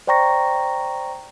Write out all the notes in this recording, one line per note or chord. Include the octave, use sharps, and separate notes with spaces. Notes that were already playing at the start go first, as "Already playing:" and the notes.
C5 D5 G5 A#5 C#6 A#6